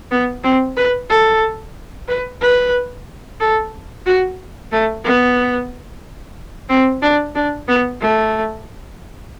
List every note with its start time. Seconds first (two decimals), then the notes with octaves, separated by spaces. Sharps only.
0.11 B3
0.44 C4
0.77 B4
1.10 A4
2.08 B4
2.41 B4
3.40 A4
4.06 F#4
4.72 A3
5.05 B3
6.69 C4
7.02 D4
7.35 D4
7.68 B3
8.01 A3